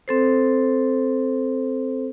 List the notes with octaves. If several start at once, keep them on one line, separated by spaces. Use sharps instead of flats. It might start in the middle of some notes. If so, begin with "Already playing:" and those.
C4 A4 C5